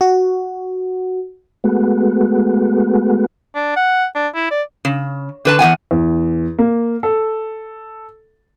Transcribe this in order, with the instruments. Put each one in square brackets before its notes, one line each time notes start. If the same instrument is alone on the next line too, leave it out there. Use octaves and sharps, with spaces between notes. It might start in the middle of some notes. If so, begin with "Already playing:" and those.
[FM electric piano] F#4
[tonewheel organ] G#3 A3 B3 F#4
[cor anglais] D4
F#5
D4
E4
D5
[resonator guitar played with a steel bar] C#3
D3 B4 A5
E2 G#2 F#5 G#5
[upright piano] E2
A#3
A4